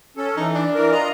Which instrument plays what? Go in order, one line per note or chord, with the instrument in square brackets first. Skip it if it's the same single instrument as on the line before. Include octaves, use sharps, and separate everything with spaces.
[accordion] C#4 A4
[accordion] E3 [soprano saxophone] D#4
[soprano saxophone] D4
[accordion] E3 A#4
F4 D#5 A#5